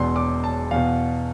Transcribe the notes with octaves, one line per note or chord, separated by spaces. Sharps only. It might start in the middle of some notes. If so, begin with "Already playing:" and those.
Already playing: E1 E2 B2 C6
D6
A5
E2 B2 F5